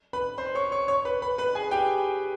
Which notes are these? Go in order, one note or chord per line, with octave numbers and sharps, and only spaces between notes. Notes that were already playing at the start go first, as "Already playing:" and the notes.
B4 B5
C5 C6
C#5 C#6
C#5 C#6
C#5 C#6
B4 B5
B4 B5
B4 B5
G#4 G#5
G4 G5